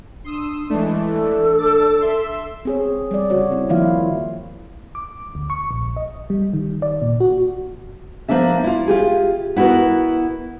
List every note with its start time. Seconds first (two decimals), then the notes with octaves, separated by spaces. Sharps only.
0.24 D4 C6 D#6 E6
0.70 E3 G#3 A3 D4
1.06 A4
1.59 A5 D6 A6
2.00 E5 C6 E6
2.65 C4 G#4 C#5
3.11 G3 D5
3.30 C#3 F#4 C#5
3.52 C4 E4
3.69 D#3 F3 A#3 E4 F4 F5
4.95 D6
5.35 D2
5.50 C#6
5.71 A#1
5.96 D#5
6.30 G3
6.53 D#3
6.82 D5
7.02 A#2
7.20 F#4
8.28 F3 A#3 B3 D4 E5
8.64 E4 F4
8.87 F4 G4 G#4
9.56 B3 E4 F#4 A#4 B4